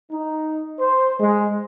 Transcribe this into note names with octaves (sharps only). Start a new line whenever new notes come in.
D#4
C5
G#3